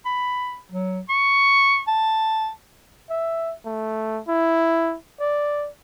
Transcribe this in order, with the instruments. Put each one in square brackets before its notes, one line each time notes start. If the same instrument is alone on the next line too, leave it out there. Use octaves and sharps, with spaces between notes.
[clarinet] B5
F#3
C#6
A5
[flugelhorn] E5
A3
E4
D5